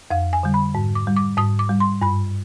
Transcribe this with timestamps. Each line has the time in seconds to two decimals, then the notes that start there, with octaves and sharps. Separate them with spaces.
0.10 F2 F5
0.33 G#5
0.43 D3 G3
0.54 B5
0.75 G#2
0.95 D6
1.07 G3
1.17 D6
1.38 G#2 D#6
1.59 D6
1.69 G3
1.80 C6
2.02 G2 B5